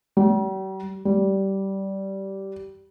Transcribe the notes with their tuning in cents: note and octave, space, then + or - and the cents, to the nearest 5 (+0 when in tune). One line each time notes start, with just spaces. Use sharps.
G3 -45
G3 -15